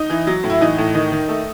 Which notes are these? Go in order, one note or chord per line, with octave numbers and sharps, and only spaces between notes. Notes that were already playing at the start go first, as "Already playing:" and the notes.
Already playing: D#4
E3
F#3
A2
E4
E3 D#4
A2
D#3 D#4
D#3
A3